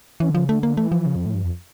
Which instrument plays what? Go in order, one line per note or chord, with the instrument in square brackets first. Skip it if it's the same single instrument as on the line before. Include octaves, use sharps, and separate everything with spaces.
[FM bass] E3 [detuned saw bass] C#4
[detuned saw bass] D3
[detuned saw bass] C#3 [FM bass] F3
[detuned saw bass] D3 [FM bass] A3
[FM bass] A#3
[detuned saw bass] E3 [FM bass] A3
[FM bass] F3
[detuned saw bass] C#3
F2
A2
G2
F2